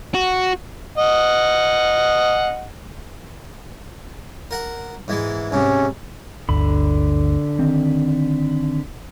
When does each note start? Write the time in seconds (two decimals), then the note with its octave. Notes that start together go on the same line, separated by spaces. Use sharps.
0.14 F#4
0.98 D#5 F#5
4.51 A#4 F#5
5.08 G#2 E3 G#3
5.52 G#2 C3 C#4
6.49 G1 D2 D3 B5
7.59 D#3 C4